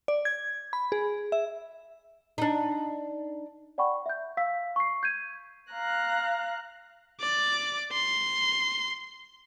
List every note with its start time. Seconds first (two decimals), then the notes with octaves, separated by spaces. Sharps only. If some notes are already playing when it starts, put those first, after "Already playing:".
0.08 D5
0.25 G#6
0.73 B5
0.92 G#4
1.32 E5
2.38 D4 D#4
3.78 D5 F#5 G5 B5 C#6
4.06 E5 G6
4.37 F5 E6 B6
4.76 C#6 C7
5.03 G6 G#6 D#7
5.73 F5 A#5 F#6
7.20 D5 D6
7.92 C6